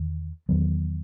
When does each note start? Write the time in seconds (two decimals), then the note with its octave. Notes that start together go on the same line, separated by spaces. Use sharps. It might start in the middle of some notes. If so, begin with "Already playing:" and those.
Already playing: E2 D#3
0.49 E2 D#3 F#3 B3